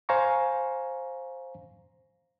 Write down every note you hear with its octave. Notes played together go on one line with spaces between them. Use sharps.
C5 F5 G#5 A#5 C#6